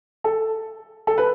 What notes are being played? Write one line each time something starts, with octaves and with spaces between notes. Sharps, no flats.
A4
A4
B4